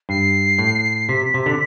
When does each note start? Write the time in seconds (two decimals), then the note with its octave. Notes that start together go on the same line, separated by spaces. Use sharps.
0.09 G2 C7
0.59 A2
1.08 C3 B6
1.34 C3
1.46 D3